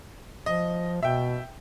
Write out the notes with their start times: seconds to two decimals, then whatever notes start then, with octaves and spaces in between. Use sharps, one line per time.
0.46 F3 D#5
1.03 B2 E5 G5